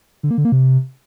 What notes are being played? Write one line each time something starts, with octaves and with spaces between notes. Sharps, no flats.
D3
A#3
D3
A#3
C3